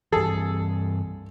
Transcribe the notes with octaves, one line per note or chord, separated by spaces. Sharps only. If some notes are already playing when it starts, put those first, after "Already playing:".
G2 E3 G#4 A4